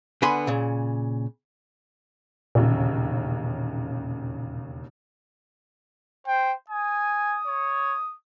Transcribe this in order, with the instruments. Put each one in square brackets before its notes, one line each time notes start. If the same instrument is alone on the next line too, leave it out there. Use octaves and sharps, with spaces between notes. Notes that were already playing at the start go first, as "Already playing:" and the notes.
[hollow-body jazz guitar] D3 B3 G#5 B5 C6
A#2 C#3
[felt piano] E1 D#2 C#3 [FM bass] A#2
[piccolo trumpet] C5 [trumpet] G5
[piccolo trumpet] G#5 [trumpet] D#6
[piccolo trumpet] C#5